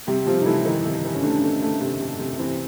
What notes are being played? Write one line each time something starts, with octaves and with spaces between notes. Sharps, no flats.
C3 G3 G4
C3 F3 F4
D#4
E3 A3 E4
D#3 E3 D#4
C3
E3
C#4
D3 A3 D4
A3
A3
C3
C3
C3
E3 C4